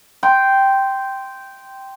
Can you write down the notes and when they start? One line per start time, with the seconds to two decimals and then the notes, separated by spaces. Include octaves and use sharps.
0.23 G5 C6